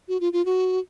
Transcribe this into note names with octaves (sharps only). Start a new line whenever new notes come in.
F#4
F4
F4
F#4